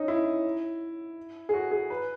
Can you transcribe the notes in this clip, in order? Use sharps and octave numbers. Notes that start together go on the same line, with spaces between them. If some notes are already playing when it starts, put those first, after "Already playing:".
Already playing: C#4 D#4
E4
G#4
F#4
G#4
B4